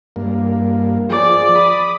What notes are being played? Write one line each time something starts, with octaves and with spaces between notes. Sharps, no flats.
G2 A#3
F3 G#4 D5
B5 D#6